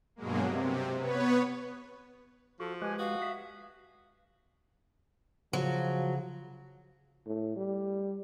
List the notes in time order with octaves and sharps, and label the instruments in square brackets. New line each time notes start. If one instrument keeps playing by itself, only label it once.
[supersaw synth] G2 B2 F#3 G#3 A#3
C3
B3 B4 C#5
[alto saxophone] F3 [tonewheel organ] F#4 [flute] A4
[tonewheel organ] G#3 G4 B4 [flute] G#5
[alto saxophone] F#4 [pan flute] F5 [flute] D#6
[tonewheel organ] E5
[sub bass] C#3 [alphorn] F3 [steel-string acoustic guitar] F#3
[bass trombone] A2
G3